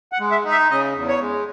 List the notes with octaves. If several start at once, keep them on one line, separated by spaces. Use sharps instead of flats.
F#5
G#3
E5
D#4
E5
C#3 D#5
E2
C#5
G#3